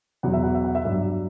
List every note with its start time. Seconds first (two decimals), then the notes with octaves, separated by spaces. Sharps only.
0.23 E2 B2 F#3 F#5
0.33 E5
0.44 F#5
0.55 E5
0.64 F#5
0.75 E5
0.85 G2 F#3 E5